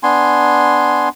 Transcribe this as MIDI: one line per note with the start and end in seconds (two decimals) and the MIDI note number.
0.03 1.09 59
0.03 1.09 62
0.03 1.09 80
0.03 1.09 84